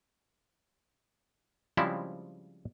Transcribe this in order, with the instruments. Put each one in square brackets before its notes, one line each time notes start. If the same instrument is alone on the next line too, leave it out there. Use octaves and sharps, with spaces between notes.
[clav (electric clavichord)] C#3 F3 G3 G#3 C4 E4